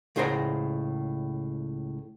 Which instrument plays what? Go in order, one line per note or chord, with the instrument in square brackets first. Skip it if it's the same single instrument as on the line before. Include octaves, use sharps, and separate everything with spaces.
[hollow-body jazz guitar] C#2 A2 G#4 C5 F#5 A#5